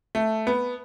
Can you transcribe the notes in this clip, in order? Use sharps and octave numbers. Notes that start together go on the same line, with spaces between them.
A3
B3